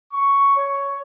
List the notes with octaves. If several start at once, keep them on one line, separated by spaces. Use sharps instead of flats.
C#6
C#5